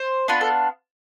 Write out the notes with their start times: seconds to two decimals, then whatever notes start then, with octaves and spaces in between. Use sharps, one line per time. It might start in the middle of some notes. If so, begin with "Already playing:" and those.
Already playing: C5
0.28 B3 D4 F4 B4
0.41 A4